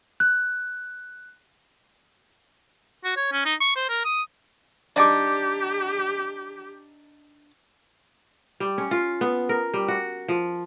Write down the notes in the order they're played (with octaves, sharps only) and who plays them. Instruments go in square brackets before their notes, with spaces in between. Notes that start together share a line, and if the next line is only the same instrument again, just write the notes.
[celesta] F#6
[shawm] F#4
C#5
C#4
D#4
C#6
C5
A#4
D#6
[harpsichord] D4 D#4 [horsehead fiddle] G4 [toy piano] D5 G#5 D6
[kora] G3
C#4
F4
B3
A#4
G3
F#4
F3